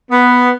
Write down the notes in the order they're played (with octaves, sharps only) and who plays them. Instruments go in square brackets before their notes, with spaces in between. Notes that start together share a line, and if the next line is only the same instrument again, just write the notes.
[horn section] B3